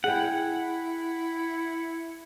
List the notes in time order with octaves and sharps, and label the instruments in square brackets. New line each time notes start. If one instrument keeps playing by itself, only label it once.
[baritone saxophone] E4 [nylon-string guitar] G#4 G5 [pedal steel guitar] F#5